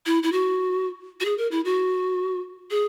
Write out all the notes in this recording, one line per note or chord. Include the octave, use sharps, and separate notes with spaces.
E4
E4
F#4
F#4
G#4
A#4
E4
F#4
G#4